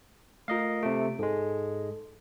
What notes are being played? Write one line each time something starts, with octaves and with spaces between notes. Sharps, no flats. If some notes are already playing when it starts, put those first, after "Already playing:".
A3 F4 A#4 D#5 F5
C3 A3 D7
G#2 G#3 A4